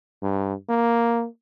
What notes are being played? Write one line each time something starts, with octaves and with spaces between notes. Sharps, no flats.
G2
A#3